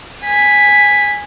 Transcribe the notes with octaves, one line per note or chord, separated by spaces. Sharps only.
G#5 B6